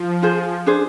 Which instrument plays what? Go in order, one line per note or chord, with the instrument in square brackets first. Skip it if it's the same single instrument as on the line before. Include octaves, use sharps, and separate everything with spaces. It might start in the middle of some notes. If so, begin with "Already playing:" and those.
Already playing: [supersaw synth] F3
[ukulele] F4 G#4 C5
D4 G#4 C5